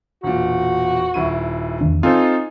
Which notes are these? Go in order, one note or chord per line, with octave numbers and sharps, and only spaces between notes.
E1 A#2 F#4
D#1 E4 D#7
E2 D#3 D4
C4 D#4 F4 A4 C5 G#5